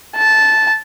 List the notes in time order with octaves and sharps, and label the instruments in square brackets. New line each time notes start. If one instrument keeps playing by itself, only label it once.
[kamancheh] A5